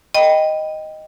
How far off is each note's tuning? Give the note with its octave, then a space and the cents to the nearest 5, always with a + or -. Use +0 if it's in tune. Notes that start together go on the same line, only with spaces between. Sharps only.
D#5 +0 G5 +0 B5 +0